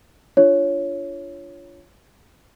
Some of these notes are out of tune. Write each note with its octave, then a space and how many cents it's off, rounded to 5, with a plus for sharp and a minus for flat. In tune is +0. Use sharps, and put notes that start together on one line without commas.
D4 +0 F4 -15 C#5 +0